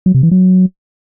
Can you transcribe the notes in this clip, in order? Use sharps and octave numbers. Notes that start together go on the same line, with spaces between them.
F#3
C3
E3
F#3